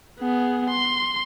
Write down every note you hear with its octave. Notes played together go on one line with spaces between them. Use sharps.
B3 G#4
C6